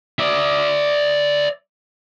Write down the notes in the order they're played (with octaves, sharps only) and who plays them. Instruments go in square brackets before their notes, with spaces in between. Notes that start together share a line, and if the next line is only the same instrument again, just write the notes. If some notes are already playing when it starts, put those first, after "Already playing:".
[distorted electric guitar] D5 E5